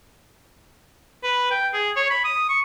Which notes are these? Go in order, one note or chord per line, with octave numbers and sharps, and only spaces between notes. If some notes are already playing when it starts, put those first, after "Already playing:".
B4
G5
G#4
C#5
B5
D#6
C#6